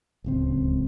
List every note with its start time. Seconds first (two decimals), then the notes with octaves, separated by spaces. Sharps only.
0.24 D1 C#2 C4